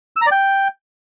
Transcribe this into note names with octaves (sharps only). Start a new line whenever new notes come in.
E6
A#5
D5
G5